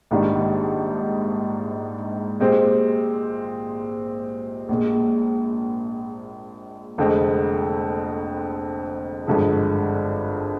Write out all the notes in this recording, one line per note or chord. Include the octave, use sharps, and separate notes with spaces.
A#1 G#2 D#3 G3 D4
A#2 G#3 C4 G4 C5
A#1 A#2 G#3
F1 F2 D3 G#3 C4
G#1 G2 D3 F3 G#3